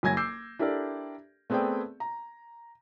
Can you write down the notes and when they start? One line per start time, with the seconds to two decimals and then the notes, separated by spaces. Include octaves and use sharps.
0.03 F#1 F#3 G#5 G#6 A#6
0.17 D6 E6 G6 C7
0.59 D4 E4 G4 A4 A#4 D5
1.50 A3 B3 C4 G#4 D5 G5
2.00 A#5